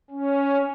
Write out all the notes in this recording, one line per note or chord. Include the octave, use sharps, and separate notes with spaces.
C#4